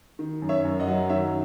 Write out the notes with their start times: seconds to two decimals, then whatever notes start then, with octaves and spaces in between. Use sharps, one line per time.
0.19 D#3
0.42 F#2
0.49 C#5 E5
0.65 F#2
0.80 D#5 F#5
0.88 F#3
1.10 D#3 C#5 E5